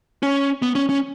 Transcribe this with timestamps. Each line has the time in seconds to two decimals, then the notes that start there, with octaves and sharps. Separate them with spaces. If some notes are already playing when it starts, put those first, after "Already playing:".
0.23 C#4
0.62 B3
0.75 C#4
0.89 C#4